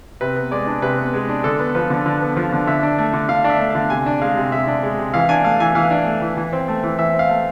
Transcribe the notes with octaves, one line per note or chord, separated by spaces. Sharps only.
C3 B4
B3
G#3 D5
D4
C3 B4
B3
G#3
D4
D3 A4
B3
F3 B4
D3
D3
B3
F3
D3
D3 E5
D4
A3
D3
D3 F5
D4
E5
A3
D3 F5
C3 G#5
D4
G#3 F5
C3
C3 E5
D4
G#3
C3
E3 F5
D4 G#5
A3 F5
E3 G#5
E3 F5
D4
A3
E3
E3
C4
A3
E3
E3 E5
C4
F5
A3